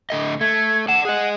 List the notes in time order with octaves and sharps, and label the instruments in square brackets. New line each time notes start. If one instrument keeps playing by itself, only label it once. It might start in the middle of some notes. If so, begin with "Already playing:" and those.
[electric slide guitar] D3 A3 D#5
[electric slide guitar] A3 [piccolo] G#6
[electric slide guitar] D5 F#5 [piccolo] E7
[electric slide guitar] G#4 D#5 [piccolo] F#5